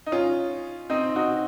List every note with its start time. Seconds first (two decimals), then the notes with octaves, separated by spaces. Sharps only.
0.06 D#4
0.12 C#4 F4
0.90 C4 D#4
1.16 D#4 F#4